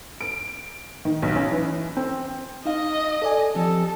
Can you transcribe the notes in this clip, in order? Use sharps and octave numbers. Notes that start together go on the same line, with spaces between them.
D7
D#3
B1
C#4
E3
C4
D#4 D#5 F5
A4 D5 G#5
F3 C4 G4 A4